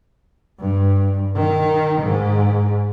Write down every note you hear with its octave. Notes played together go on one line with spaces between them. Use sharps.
G2
D#3
G#2